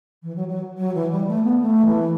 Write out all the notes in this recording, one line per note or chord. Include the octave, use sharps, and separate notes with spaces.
E3
F#3
F#3
F#3
E3
G3
A3
B3
A3
E3